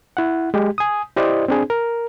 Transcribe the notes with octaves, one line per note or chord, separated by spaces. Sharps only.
E4 F#5
G#3 G4
G#5 D#6
E4 G4 C5 D5 D#5
C4 D4 G#4
A#4